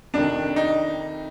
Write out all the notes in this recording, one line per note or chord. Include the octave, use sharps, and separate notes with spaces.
F2 C3 D#3 D4
D#4